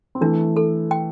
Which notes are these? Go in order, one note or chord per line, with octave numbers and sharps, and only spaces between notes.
C4
E3 A3 D4
A4
G5